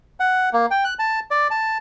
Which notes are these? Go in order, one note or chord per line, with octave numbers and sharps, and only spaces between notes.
F#5
A#3
G5
F#6
A5
D5
A5